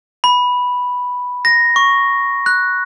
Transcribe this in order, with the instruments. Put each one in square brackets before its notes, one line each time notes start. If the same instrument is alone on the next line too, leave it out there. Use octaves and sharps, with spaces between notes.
[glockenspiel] B5
A#6
C#6
F#6